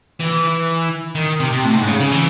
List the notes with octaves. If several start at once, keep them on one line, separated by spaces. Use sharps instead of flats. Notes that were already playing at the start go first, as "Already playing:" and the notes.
E3
D#3
C3
C3
A2
G#2
C#3
C#3
E3